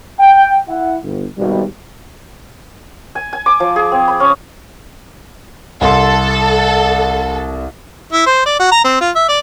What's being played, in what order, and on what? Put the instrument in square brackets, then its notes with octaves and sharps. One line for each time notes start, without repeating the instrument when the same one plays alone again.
[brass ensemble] G5
E4 F#5
G1
G#1 B2 G3
[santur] G#5
G#5
D6
F3
G#4
C4
B5
C#4
[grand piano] C2 C6 [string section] A4
[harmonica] E4
C5
D5
F#4
A#5
C4
F4
E5
D5